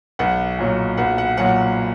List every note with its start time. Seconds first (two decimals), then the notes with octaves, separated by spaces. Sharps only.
0.19 B1 F#5
0.59 A#2 F#3
0.97 B1 F#5
1.18 F#5
1.37 A#2 F#3 F#5